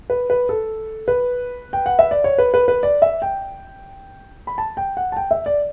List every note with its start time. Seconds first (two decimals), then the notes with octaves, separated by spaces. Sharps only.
0.10 B4
0.30 B4
0.49 A4
1.08 B4
1.73 G5
1.86 F#5
1.99 E5
2.11 D5
2.24 C#5
2.38 B4
2.54 B4
2.68 B4
2.83 D5
3.02 E5
3.22 G5
4.47 B5
4.58 A5
4.77 G5
4.97 F#5
5.12 A5
5.17 G5
5.31 E5
5.46 D5